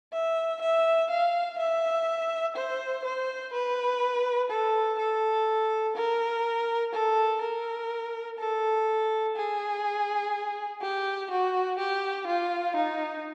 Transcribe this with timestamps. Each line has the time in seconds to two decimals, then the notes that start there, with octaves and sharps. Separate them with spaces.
0.13 E5
0.61 E5
1.10 F5
1.59 E5
2.56 C5
3.04 C5
3.53 B4
4.50 A4
4.99 A4
5.96 A#4
6.93 A4
7.41 A#4
8.38 A4
9.36 G#4
10.82 G4
11.30 F#4
11.78 G4
12.27 F4
12.76 D#4